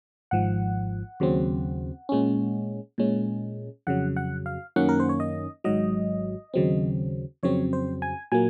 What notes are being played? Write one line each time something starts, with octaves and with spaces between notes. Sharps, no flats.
G#1 G#2 F3 F#5
D#2 C#3 F#3 C4
A#2 G#3 C#4
A#2 G#3 C#4
F2 C#3 F#3 F#5
F#5
F5
F#2 D#3 A#3 C#4 F#5
A#4
C5
C#5
D#5
G#1 G#2 F#3 D#5
D#2 C#3 F#3 C4
F2 C#3 F#3 C4 C#5
C5
G#5
A#2 F#3 A#3 G#5